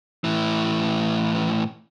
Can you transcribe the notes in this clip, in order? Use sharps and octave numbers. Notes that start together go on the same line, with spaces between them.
A2 E3